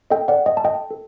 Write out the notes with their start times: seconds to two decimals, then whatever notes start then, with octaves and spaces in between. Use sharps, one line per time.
0.10 A4 D#5 G5
0.28 D5 F#5
0.37 A4
0.46 D#5 G5
0.57 A5
0.64 A4 D#5 G5
0.91 A4